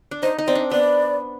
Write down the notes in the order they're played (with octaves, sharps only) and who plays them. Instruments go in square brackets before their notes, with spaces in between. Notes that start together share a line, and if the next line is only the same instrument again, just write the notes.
[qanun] D4
[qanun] D#4 [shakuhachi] C5
[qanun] D#4
[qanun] C4 [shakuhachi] D5
[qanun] D4
[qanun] B3 [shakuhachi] D5